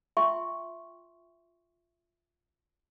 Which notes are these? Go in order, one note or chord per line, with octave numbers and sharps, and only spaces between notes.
F4 E5 G5 C6 C#6